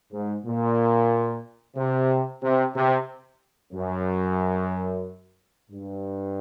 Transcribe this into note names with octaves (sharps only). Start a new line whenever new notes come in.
G#2
A#2
C3
C3
C3
F#2
G2